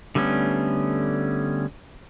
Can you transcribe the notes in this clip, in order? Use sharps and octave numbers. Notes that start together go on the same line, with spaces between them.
D3 G3 A3 B3 C#4